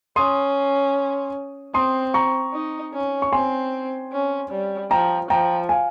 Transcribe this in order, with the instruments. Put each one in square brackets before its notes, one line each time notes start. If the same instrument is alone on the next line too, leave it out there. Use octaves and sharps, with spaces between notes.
[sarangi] C#4 [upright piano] C6 D#6
[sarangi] C4 [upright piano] C6 D#6
[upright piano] A#5 C#6
[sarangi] D#4
C#4
[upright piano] C#6
[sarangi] C4 [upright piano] G#5 C6
[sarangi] C#4
G3
[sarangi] F3 [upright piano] G5 A#5
[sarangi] F3 [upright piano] G5 A#5
[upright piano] F5 G#5